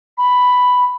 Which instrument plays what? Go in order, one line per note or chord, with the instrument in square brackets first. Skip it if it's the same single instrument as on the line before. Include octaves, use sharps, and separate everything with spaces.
[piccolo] B5